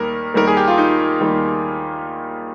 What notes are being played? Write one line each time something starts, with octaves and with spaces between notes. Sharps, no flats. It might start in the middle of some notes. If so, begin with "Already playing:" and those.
Already playing: D#2 D#3 G3 A#3 A#4
D#2 D#3 G3 A#3 A#4
G#4
G4
F4
D#4
D#2 D#3 G3 A#3